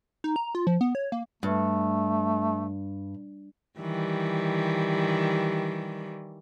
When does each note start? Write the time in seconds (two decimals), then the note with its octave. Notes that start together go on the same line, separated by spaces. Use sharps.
0.24 D#4
0.36 A#5
0.55 F4
0.67 F3
0.81 B3
0.95 C#5
1.12 A#3
1.43 G2 A3
3.79 D#3 E3 G3